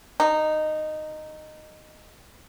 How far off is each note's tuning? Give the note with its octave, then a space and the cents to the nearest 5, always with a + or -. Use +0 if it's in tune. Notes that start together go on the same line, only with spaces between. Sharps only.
D#4 -10